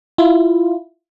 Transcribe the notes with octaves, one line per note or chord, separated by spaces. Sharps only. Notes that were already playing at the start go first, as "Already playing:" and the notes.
E4 F4